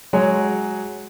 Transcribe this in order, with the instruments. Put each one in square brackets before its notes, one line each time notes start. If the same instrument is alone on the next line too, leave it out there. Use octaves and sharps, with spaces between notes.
[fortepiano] F#3 G#3 C#5 G#5